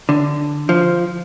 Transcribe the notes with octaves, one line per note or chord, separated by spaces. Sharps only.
D3
F3